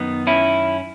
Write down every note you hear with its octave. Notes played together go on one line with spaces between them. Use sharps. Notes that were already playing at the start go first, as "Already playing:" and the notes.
Already playing: F#2 D#3 B3 D#4
C#4 E4